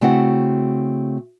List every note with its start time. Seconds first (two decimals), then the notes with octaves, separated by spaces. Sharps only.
0.01 C#3 A3 C4 E4 F#4 F#5